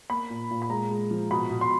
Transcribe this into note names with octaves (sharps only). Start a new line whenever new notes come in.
A#3 B5
A#2
A#2
B5
G#3 A#5
G#3
F3
B2 B5
B2
C6